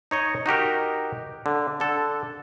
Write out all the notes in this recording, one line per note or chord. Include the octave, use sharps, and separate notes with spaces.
D#4 C#5 D#5
D#4 F#4 G4 A#4
D3
D3 A4